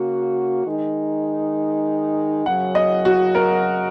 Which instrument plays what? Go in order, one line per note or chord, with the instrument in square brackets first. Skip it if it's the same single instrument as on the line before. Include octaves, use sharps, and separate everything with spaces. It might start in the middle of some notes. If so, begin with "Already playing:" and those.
Already playing: [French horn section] C#3 A#3 F#4
D#3 G#3 D#4
[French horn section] F#2 C#3 F#3 [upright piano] F#5
[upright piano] D#5
F#4
A#4